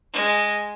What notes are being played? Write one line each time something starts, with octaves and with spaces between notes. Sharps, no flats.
G#3